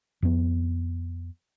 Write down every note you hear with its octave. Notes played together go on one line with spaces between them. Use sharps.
F2 B3